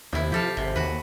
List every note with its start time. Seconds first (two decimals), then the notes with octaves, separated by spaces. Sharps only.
0.13 D#2 C3 E4
0.32 F3 G4 A4 F5
0.57 G#1 C3
0.76 D#2 F#4 B4